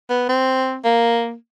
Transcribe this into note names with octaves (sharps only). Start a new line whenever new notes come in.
B3
C4
A#3